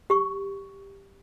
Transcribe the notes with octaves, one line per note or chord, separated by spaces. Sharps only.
G4 C#6